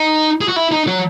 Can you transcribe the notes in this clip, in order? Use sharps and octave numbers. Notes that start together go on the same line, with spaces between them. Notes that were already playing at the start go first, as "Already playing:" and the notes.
Already playing: D#4
G#4
F#4
E4
D#4
F#3